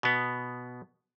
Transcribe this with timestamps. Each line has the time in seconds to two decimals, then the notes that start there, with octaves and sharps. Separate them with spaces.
0.03 B2 B3